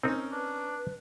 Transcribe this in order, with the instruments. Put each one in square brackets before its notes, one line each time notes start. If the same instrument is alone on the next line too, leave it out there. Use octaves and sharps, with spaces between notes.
[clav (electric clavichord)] C4 D#4 [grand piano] C#4 A#4
[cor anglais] D4 [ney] B4